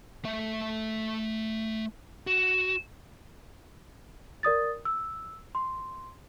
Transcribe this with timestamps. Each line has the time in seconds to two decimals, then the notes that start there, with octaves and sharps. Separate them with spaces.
0.25 A3 E5
2.27 F#4 E7
4.43 A#4 D5 D#6 A6
4.85 E6
5.55 C6